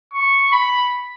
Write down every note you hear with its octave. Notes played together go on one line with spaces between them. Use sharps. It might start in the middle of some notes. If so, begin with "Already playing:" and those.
C#6
B5